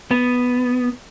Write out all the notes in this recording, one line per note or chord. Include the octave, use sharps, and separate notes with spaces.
B3